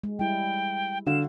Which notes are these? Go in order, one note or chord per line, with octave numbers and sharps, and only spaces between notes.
G#3
G3 E4 G5
D3 F#4 F5 E7